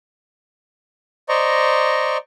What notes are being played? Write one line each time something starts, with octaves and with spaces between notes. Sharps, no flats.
C5 D5 D#5 A#5 C#6